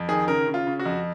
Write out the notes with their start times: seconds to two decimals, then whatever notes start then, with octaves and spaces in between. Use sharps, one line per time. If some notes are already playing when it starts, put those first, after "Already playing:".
Already playing: F2
0.09 D#3 G#4
0.28 C#3 A#4
0.48 C#3
0.54 F4
0.67 C#3
0.80 F#4
0.85 F2